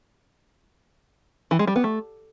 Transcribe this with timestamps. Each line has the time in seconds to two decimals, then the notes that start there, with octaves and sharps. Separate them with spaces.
1.51 E3
1.59 G#3
1.67 G3
1.76 B3
1.84 A3